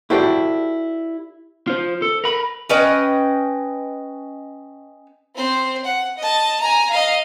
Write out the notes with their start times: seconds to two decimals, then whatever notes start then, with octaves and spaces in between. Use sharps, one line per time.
0.10 E4 F#4 G4 A4 C5 D5
1.67 F4 C5
2.02 A4
2.24 A#4 B5
2.69 C#4 B4 D#5 G5
5.35 C4 C5
5.85 F#5
6.18 D#5 A5
6.60 G#5 A#5
6.90 D#5 F5